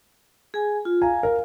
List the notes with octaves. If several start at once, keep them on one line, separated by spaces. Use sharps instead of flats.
G#4 G#5
F4
F5 G#5 A#5
A#4